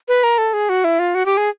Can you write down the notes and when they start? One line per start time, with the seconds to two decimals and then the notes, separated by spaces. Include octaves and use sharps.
0.08 B4
0.23 A#4
0.38 A4
0.54 G#4
0.69 F#4
0.84 E4
0.99 F4
1.15 F#4
1.26 G4
1.37 G#4